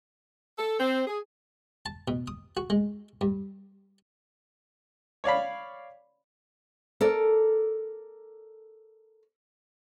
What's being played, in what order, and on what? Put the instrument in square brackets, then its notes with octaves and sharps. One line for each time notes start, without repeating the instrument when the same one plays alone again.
[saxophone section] A4
C4
G#4
[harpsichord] A5
B2
D#6
F#4
G#3
G2
[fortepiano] C#5 D5 F5 B5
[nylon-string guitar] A4 A#4 D5